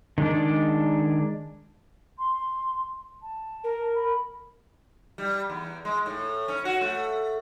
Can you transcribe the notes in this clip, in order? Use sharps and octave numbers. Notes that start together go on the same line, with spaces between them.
D#3 G#3 D4
C6
A5
A#4
B5
G3
E2
G#3
A2
C#4
F#4
A3